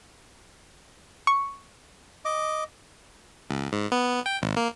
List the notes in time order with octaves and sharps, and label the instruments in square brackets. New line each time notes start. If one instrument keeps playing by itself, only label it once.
[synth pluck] C#6
[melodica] D#5 D6
[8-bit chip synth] C#2
G#2
B3
G5
G#1
A#3